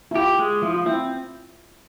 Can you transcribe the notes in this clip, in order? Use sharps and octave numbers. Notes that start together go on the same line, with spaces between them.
E4
F4 G4
G#3
F3 E4
F4
C4 E4